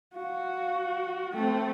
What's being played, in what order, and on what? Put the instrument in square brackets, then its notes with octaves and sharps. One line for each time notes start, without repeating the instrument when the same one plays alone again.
[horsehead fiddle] F#4 [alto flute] F5
[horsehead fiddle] A3 C4 [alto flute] G5